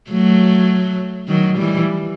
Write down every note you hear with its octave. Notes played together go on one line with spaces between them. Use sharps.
F#3 A3
D#3 F#3
E3 G3